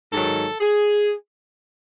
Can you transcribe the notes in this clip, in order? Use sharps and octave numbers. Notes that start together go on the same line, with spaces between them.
G#2 D#3 F#3 A4
G#4